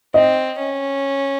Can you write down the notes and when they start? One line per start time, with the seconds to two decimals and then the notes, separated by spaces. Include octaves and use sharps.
0.14 C4 D#5
0.58 C#4